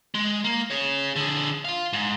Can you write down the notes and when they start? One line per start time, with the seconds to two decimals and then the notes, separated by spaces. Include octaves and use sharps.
0.14 G#3
0.44 A#3
0.70 G#4 C#5
1.16 D3 G#4
1.65 F4 F5
1.93 G#2